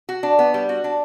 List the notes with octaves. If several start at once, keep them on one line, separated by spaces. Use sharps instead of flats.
F#4
D4
B3
G3
F#4
D4